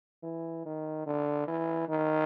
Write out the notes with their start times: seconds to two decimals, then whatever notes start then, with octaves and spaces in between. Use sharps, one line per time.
0.24 E3
0.66 D#3
1.06 D3
1.47 E3
1.89 D#3